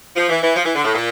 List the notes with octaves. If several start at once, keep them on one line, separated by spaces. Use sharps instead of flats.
F3
E3
E3
F3
E3
D3
A2
A#2